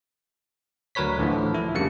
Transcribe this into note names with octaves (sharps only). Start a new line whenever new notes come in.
D2 F#3 A#4 B4 C#5 B6
A2 D3 E3 F3
E4
F2 C#3 G3 A#3 D4 C#7